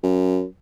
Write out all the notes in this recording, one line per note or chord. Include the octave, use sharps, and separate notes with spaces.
F#2